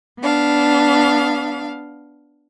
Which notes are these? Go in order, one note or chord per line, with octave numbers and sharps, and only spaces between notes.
B3 D4 F5